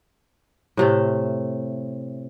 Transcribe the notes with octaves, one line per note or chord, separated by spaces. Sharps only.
A2 C3 A3